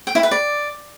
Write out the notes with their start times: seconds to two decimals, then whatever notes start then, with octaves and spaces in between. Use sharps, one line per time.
0.07 G5
0.15 E4
0.23 B4
0.31 D5